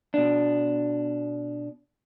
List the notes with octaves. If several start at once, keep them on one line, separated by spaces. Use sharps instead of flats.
B2 D4